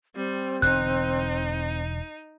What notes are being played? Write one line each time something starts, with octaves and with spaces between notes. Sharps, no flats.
G3 C4
E1 D3 D#4 F#6